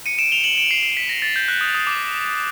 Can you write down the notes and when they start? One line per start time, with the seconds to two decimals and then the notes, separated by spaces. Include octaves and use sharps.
0.06 C#7 D#7
0.18 D7 E7
0.32 F7 G7
0.44 E7 F#7
0.57 D7 E7
0.71 C7
0.83 C7
0.97 B6
1.09 A#6
1.22 A6
1.36 G6
1.48 F#6
1.61 D#6
1.75 D#6
1.87 D6